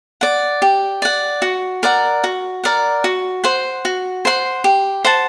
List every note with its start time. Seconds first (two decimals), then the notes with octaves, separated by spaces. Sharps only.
0.21 D5 F#5
0.62 G4
1.02 D5 F#5
1.42 F#4
1.83 A#4 D5 F#5
2.24 F#4
2.64 A#4 D5 F#5
3.04 F#4
3.44 C5 F#5 C6
3.85 F#4
4.25 C5 F#5 C6
4.64 G4
5.05 C5 F#5 A5